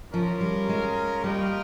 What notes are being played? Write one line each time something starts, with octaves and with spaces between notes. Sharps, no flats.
F3 C#4 F4 A#4
G3
G#3
G3 A#3 F4 A#4 D#5 G5